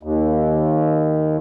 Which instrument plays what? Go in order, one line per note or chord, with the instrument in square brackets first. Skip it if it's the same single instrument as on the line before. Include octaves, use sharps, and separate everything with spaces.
[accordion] D#2